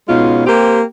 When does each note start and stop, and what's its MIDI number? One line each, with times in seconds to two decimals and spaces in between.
0.09 0.47 47
0.09 0.47 56
0.09 0.47 61
0.09 0.47 63
0.09 0.47 65
0.47 0.80 58
0.47 0.80 60
0.47 0.80 67